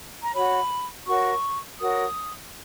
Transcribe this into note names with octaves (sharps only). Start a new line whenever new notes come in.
A#5
F#4 C#5 B5
F#4 A#4 C#5 C#6
F#4 A#4 C#5 D#6